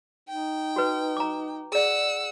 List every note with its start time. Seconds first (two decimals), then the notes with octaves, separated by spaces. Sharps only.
0.29 D#4 G5
0.76 F#4 B4
1.17 A#5 D6
1.72 G#4 D5 F#5 E6